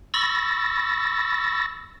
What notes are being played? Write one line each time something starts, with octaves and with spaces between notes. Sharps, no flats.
B5 C#6 E6 A6 A#6